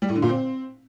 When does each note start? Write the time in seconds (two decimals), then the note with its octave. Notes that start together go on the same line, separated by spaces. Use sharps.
0.02 G3
0.09 A2
0.16 D3
0.22 A#2
0.29 C4